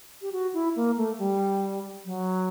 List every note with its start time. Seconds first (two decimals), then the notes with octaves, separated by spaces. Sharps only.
0.22 G4
0.32 F#4
0.54 E4
0.76 A#3
0.97 A3
1.19 G3
2.05 F#3